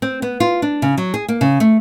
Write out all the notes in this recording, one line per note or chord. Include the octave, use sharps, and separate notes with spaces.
C4
B3
F4
D4
C#3
F#3
G#4
A#3
C#3
A3